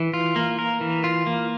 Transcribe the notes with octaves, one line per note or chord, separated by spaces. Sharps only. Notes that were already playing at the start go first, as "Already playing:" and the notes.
Already playing: E3
F4
A#3
A#4
E3
F4
A#3